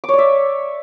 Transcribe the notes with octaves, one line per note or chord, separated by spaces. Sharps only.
C#5 D5 E5 D6